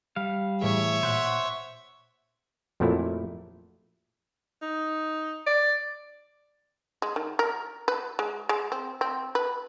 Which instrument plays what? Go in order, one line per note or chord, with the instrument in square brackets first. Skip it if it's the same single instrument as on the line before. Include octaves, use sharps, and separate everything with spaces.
[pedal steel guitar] G3 F5
[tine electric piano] A2 E3 G#4 [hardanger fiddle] C#5 E5
[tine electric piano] A#2 [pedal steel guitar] C5 F#5
[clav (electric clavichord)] F2 A#2 F3 F#3 A3 E4
[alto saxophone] D#4
D5
[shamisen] G#3
D#3
A#4
B4
G#3
G#3
C4
C4
B4